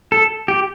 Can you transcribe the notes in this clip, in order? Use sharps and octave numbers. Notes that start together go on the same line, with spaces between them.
A4
G4